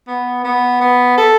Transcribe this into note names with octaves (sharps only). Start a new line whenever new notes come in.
B3
B3
B3
A4